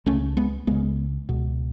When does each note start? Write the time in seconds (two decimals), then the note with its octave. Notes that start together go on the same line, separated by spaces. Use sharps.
0.06 C#2 C#3 A3 C#4
0.37 G#3 B3
0.67 C#2 C#3 G#3 B3
1.29 C#2 B2